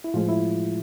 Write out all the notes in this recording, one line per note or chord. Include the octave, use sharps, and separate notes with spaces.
E4
A2 F3 G#3 F4
E4